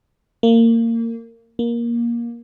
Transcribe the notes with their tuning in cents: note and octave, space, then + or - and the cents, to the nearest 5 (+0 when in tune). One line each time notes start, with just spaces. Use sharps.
A#3 -25
A#3 +15